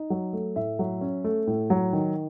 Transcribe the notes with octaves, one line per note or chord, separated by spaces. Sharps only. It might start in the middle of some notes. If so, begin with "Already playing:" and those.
Already playing: D#4
F#3
A3
A2 E5
F#3
C#4
A3
A2
F#3
D#3